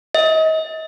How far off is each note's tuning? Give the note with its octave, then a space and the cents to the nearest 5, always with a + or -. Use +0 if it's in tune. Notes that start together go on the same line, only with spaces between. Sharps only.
D#5 +35